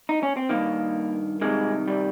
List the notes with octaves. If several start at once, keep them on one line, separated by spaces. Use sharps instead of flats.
D#4
C#4
C4
G2 D#3 A#3
C2 C3 D#3 G#3
G3